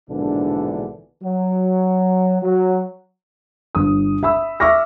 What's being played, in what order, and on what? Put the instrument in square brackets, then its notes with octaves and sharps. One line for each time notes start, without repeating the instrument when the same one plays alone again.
[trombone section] A#1 G#2 B2 D3 E3 D4
F#3
F#3
[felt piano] G1 D#6
E5 B5 E6
E5 C#6 D6 F6 A#6